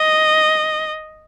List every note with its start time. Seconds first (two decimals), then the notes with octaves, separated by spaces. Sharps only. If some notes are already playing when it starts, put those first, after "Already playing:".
Already playing: D#5